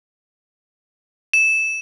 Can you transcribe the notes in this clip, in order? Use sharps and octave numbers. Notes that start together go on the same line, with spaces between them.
E7